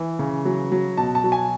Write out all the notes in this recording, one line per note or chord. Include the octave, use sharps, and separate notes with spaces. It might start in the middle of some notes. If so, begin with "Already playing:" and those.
Already playing: E3
C#3
F#3
F#3
B2 A5
A5
F#3
G#5